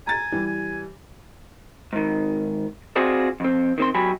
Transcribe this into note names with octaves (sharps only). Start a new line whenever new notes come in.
G#5 A#5 A6
E3 G3
G#5
G#2 D#3
C4 F4 F#4 G#4 C5 D5
F2 C4
D#3 C4 C6
B1 F#3 G4 G#5 B5